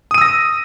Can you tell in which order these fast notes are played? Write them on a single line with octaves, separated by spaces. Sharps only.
D#6 D#7 E6 A#6